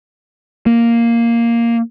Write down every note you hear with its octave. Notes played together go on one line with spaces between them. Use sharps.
A#3